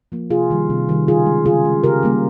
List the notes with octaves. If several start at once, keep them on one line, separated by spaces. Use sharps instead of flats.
F3 A#3
C3 F4 G#4
D#3 G3
C3
D#3 G3
C#3 F4 G#4
G#3
C#3 F4 G#4
G#3
C#3 G4 A#4
G3 A#3